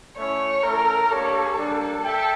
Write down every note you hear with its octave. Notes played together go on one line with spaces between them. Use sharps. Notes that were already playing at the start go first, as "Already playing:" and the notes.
A3 C#4 E4 C#5
A3 C#4 E4 A4 A#4
A#3 D4 G4 A4 C#5
G3 A#3 D4
A4 E5 G5